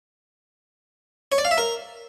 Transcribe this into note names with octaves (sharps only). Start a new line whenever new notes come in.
C#5
D5
F5
E5
A#4